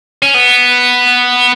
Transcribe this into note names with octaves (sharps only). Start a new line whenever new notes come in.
C#4
B3